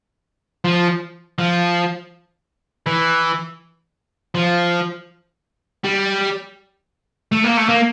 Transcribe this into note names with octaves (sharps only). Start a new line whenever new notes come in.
F3
F3
E3
F3
G3
A3
A#3
A3
A#3